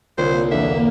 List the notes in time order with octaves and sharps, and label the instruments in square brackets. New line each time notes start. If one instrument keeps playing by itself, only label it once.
[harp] C2 D3 C#5 [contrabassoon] A#2 [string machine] A#3 [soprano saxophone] C5
[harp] E2 F#4 [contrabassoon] D3 [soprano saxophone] E5